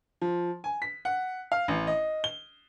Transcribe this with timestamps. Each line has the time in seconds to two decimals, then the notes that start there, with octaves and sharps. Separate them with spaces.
0.22 F3
0.64 G#5
0.82 B6
1.05 F#5
1.52 F5
1.68 A1
1.87 D#5
2.24 G7